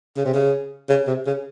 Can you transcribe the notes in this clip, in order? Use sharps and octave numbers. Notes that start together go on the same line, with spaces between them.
C#3
C3
C#3
C#3
C3
C#3